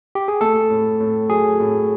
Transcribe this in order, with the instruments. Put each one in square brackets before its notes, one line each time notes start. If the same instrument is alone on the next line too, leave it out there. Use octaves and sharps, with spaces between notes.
[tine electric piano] G4
G#4
[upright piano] A3 [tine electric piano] A4
[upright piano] A2
A2
[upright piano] F#3 [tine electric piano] G#4
[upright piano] A2